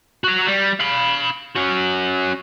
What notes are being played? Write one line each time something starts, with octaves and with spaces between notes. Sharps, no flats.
F#4 A#5
G3
F5 B5
C#4 F#4